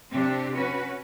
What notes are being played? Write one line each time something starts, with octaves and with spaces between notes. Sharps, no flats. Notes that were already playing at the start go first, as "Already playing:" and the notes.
C3 C4 D4 G4
C#4 F#4 B4